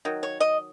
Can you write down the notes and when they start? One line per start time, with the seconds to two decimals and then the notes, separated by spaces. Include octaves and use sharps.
0.05 D#3 F#3
0.23 C#5
0.40 D#5